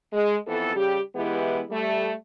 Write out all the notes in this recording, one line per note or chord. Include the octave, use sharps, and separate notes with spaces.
G#3
F2 E3 B3 A4
C#3 G3 G4
E3 G#3 B3 E4 G4
G3 A3